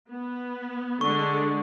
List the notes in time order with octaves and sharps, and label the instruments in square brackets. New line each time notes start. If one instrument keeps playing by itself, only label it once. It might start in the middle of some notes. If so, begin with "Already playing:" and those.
[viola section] B3
[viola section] D3 G#3 [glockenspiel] C#6